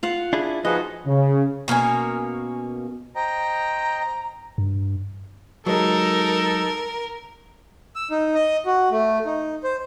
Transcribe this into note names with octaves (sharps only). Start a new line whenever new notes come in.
F4 F5 F#5
D4 E4 G#4
F3 D#4 F4 F#4 G#4 B4 D#5
C#3
B2 A#3 C#4 G#5
C5 D#5 G5 A#5
G2
F#3 G#3 D#4 A4 A#4
E6
D#4
D#5
F#4
A3
D#4
C5